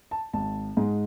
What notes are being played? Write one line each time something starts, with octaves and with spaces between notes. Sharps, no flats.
A5
G#1 A5
G#2 G#3